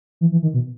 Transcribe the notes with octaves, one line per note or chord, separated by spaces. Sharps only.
E3
E3
D#3
B2